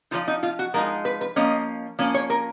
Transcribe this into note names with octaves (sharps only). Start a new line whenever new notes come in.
F3 G#3 D#4 F4
D#4
F4
F#4
F3 G#3 D#4 A#4
B4
B4
F3 A#3 C#4 D#5
F3 A#3 C#4
C#5
A#4